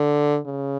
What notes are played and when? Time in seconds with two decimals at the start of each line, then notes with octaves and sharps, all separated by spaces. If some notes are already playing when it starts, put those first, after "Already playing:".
Already playing: D3
0.46 C#3